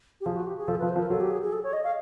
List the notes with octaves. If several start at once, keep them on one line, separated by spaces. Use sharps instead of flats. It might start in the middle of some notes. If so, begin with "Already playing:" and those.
G4
F3 G#4
F#4
G4
G#4
F3 A4
B4
F3
C5
F3
A#4
F#3 A4
G4
G#4
G#4
A4
C#5
D#5
F5